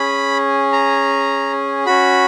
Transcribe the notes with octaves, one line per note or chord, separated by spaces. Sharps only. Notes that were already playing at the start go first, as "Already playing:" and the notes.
Already playing: C#4 G#4 B5
A#5
C#4 F#4 B5